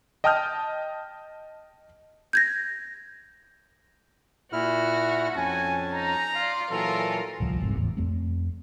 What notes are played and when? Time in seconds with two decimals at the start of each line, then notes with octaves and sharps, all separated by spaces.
0.24 D#5 G5 A5 D#6 F6 G6
2.33 G6 G#6 A#6
4.53 A#2 E4 F#4 F6
5.36 F2 C#4 G#5 A5
5.92 D#4 A#5
6.35 F4 D5 F5
6.71 A#2 E3 F#3 F4 A4 A#4
7.40 D1 C2 F3
7.60 F1 C2 G#2 C3
7.77 E2 A2
7.97 F2 A3 C4